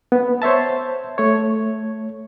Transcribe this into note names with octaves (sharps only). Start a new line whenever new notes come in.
B3
C5 C#5 E5 A5
A3 C#5